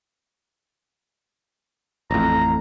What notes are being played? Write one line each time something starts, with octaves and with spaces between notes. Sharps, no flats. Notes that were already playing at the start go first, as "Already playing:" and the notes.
A1 F2 A#5